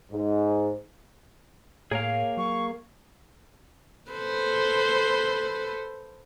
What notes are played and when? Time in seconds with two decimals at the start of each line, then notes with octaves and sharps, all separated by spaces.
0.12 G#2
1.91 A2 A#3 G#4 A#4 C#5 F5
2.37 F#3 C#6
4.11 A4 B4 C5